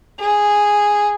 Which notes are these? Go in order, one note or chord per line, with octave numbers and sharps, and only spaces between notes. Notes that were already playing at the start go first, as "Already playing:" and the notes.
G#4